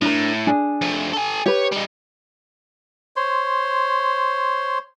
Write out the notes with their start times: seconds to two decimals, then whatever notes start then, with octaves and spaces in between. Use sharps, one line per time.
0.02 A2 D4 A#4
0.47 D4 G#4
0.81 F3 A3
1.13 A4 G#5
1.46 G4 B4 C#5
1.72 G3 D#4
3.16 C5 C#5 C6